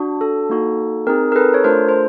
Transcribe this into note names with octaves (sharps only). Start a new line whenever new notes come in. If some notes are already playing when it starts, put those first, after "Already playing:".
Already playing: D4 F#4
A4
A#3 D#4 F#4 A4
C4 D#4 G#4 A#4
A#4
A4 B4
C#5
A3 D4 F4 A4 A#4 C5
C5